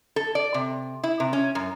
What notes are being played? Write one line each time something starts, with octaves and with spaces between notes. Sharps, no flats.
A4
D5
C3
E4
C3
C#4
F#2